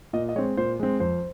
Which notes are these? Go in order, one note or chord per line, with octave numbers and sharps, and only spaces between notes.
A#2 D#5
D#5
G#3 C4 C#5
A#2 C5
G#3 C4
F2 C5